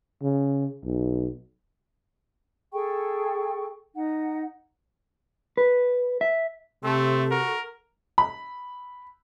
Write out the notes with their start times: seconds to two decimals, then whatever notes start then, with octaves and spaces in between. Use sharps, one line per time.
0.22 C#3
0.84 B1
2.73 G#4 A4 G5 C#6
3.95 D#4 F#5
5.57 B4
6.21 E5
6.84 C3 A3 C4 A4
7.31 F#4 A#4
8.18 B5